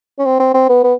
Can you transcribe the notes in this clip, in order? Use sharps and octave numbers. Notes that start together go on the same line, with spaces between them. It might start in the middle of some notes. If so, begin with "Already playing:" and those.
C#4
C4
C4
C4
B3
B3